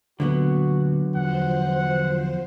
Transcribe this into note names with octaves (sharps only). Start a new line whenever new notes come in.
D2 A#2 D3 F#3 B3 F#4
E2 F3 C5 F#5